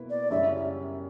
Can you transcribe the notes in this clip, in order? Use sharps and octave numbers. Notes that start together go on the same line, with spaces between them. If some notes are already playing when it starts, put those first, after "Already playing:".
Already playing: B2 A#3 E4 B4
D5
F#2 C#3 G3 C#4 E4 E5